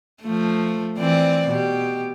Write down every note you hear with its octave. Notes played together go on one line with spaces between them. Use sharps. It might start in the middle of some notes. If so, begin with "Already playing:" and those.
F3 A3
E3 C4 D5
B2 G4